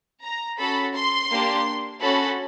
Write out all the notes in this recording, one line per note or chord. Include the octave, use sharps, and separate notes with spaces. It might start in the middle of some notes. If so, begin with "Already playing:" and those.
A#5
C#4 F#4 A4 B5
C6
A#3 D4 G4
C#4 F#4 A4 B5